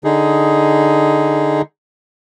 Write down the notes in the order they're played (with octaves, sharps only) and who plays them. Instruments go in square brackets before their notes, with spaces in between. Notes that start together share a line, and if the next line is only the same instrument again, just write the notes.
[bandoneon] D3 D#4 G#4